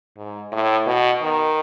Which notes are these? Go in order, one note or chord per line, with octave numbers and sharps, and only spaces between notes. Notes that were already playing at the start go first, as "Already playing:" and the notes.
G#2
A2
B2
D#3